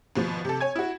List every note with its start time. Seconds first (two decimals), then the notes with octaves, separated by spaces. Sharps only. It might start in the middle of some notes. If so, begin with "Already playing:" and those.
0.16 G#1 B2 F3
0.45 C3 A4
0.60 C#5 G#5 G#6
0.76 E4 F#4